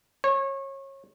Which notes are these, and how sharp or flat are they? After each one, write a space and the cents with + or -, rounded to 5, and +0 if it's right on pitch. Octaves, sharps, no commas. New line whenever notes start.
C#5 -25